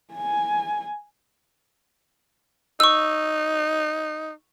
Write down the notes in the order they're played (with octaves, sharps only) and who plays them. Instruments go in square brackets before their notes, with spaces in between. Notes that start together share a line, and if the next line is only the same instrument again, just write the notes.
[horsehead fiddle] G#5
[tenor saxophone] D#4 [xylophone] C#6 E6